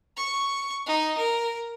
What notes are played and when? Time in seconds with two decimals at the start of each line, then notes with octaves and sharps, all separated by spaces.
0.17 C#6
0.86 D#4
1.18 A#4